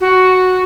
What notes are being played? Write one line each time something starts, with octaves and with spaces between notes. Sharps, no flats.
F#4